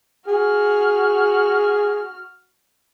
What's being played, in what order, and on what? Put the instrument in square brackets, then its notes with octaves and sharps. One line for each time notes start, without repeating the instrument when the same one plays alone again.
[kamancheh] F#4 F6 [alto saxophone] G#4